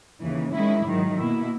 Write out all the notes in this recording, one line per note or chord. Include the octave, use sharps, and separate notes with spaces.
D#2 C#3 E3
D#3 G#3 C#4 E4
G#2 D#3 F#3
B2 A#3 E4